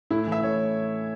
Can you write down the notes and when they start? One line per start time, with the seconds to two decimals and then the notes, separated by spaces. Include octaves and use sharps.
0.11 A2 E4
0.27 E3 E5
0.43 A2 C#5